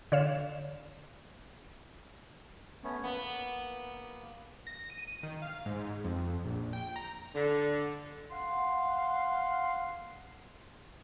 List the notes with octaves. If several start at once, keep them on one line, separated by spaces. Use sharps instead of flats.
D3 C#5 F5 E7
A3 B3 C#4
A#3 B3
A#6
D#7
D#3
F5
G#2
F2
A#1
G5
A#5
D3
F5 F#5 C6